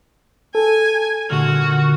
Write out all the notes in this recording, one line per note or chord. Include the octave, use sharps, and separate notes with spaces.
A4 G#5
A#2 D3 A3 F#4 F6